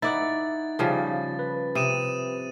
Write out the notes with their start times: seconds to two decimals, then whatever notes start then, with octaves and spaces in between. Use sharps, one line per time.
0.02 D#4 E4 D5 F#5 A6
0.79 C#3 F3 G3
1.39 B4
1.75 C3 D#6 D#7 E7